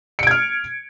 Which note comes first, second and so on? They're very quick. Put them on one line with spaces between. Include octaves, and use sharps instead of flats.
C#7 D7 G#6 F6